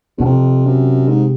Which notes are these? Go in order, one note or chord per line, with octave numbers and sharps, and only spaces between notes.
E2 B2
F2 C3
F#2
G#2